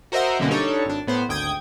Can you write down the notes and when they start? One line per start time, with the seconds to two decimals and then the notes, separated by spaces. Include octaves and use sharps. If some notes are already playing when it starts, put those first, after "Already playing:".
0.12 F#4 A#4 C5 D#5 E5 F#5
0.39 F#2 B2 D3 A#3 C4 C#4
0.50 G3 D4 D#4 A4 C#5
0.85 G#1 D4
1.07 A2 B3 C5
1.29 G#1 D2 G5 D#6 G#6